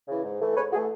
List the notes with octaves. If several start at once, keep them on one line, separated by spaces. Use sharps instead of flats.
C#3 E3
G#2
E3 A3
G#2 B4 C#5
E3 A3 F#4 G#4